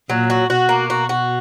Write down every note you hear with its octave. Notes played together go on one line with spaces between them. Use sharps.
A#2 F#3
F#4
B2 F#4
A#3
F#4
F#4